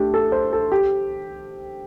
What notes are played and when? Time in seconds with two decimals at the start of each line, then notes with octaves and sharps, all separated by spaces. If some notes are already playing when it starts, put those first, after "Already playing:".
Already playing: A3 D4 G4
0.14 A4
0.32 C5
0.53 A4
0.72 G4